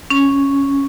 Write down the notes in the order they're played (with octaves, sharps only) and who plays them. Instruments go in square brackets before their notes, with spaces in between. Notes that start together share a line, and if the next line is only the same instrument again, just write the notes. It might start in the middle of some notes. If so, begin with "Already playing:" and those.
[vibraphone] C#4